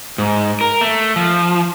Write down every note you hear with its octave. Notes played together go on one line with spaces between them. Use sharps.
G#2
A#4
A3
F3